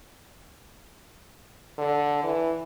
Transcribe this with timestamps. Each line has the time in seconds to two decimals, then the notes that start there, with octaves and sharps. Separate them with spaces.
1.78 D3
2.23 E3